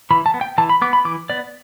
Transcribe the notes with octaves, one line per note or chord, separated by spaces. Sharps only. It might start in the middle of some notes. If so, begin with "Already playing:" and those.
E3 B5
A5
B3
G5
E3 A5
B5
B3 D6
B5
E3 D6
B3 D5